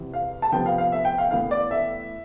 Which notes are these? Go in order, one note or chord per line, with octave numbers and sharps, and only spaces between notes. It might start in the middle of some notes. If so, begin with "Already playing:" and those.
Already playing: E2 C3 E3
F5
A5
C3 F3 B3 G5
F5
F5
E5
G5
F5
A2 E3 B3 F5
D5
E5